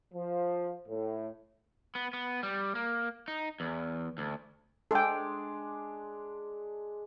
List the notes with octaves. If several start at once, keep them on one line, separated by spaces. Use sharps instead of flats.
F3
A2
B3
B3
G3
A#3
D#4
E2
D2
G#3 D4 A4 D5 F#5 G5